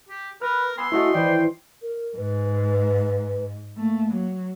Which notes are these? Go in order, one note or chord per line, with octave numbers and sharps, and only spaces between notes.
G4
A#4 B4 F6
B3 G#5 C6 E6
A3 E4 F#4 A4 C#5 D#5
E3 B4 C5 D5 G5
A#4
G#2 B4
A3 A#3
F#3